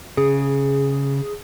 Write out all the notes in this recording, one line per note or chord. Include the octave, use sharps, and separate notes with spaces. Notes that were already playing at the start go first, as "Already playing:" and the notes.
C#3 G#4